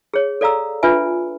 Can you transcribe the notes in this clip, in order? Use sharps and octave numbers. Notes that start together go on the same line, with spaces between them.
G#4 C#5
A4 D5 F5 A#5 E6
D4 F4 B4 E5 G#5